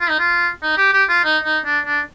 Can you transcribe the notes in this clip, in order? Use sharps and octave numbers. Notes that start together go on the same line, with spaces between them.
F4
D#4
F4
D#4
G4
G4
F4
D#4
D#4
D4
D4